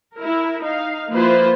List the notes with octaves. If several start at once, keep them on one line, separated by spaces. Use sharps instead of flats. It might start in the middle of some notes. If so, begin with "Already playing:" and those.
E4 A#4
D#4 F5
F3 A#3 E4 F4 B4 C5